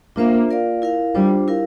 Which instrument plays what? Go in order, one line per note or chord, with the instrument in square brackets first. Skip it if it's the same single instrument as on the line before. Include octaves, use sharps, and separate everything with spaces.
[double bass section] A#3 [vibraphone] D4 F4 C5 E5
[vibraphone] F4 A#4 D5 F5
E4 A#4 F5
[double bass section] G3 [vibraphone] D4 F4 C5
[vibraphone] E4 A#4 F5